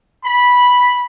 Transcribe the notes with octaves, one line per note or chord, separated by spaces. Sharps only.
B5